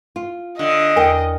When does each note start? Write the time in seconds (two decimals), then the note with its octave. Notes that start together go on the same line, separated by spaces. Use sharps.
0.16 F4
0.59 D3 D#5
0.96 E2 A#4 D5 G5